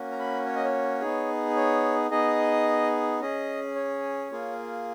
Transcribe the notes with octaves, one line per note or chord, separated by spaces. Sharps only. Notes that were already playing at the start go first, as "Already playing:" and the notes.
Already playing: A#3 C#4 F#4
A#5
B5
C#5
D#5
C#5
B3 D#4 G#4
C#5
B3 D#4 G#4 D#5
C#4 G#4 D#5
C#5
A#3 F4 G#4